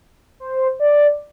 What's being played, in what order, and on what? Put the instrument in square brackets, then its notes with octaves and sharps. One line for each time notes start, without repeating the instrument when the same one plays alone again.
[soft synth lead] C5
D5